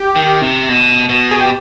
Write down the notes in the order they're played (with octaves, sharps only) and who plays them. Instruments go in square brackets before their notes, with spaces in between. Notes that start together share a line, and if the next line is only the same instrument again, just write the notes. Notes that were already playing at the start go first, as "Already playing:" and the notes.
Already playing: [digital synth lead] G4
[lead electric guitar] D#3
C3
B2
B2
[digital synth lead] G#4
G4